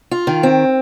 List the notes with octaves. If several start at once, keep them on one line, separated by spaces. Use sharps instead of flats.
F4
D#3
C4